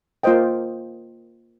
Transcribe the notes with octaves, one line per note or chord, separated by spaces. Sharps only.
A#3 F4 C5 D#5 G5